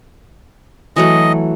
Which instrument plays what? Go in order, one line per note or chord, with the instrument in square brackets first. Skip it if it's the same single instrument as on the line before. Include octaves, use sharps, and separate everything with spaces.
[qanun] E3 F#3 A3 [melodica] D#5